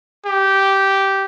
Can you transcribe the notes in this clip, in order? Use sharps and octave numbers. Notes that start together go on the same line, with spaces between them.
G4